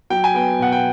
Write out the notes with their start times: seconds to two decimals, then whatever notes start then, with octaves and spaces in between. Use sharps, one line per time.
0.10 F#3 G5
0.24 G#5
0.34 B3 G5
0.59 B2 F#5
0.72 G5